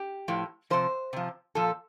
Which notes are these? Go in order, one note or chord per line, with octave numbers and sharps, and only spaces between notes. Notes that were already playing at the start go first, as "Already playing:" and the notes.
Already playing: G4
A2 F3
C3 F3 C5
C3 F3
A#2 F3 A4